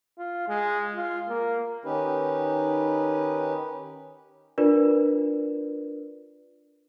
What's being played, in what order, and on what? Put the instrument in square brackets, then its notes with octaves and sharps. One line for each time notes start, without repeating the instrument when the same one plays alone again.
[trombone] F4
G#3
F4
A#3
[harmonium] D#3 C#4 D#4 G4 B4
[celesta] D4 F4 A#4 B4 D5